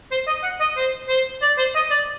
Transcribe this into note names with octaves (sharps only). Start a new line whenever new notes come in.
C5
D#5
F#5
D#5
C5
C5
D5
C5
D#5
D5